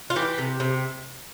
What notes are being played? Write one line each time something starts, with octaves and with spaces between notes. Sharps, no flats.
F4
E3 G4
C3
C3